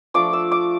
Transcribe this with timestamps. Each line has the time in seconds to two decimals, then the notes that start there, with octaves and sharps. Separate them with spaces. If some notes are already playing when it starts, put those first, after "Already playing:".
0.14 F3 A3 D4 D6
0.33 E6
0.52 D6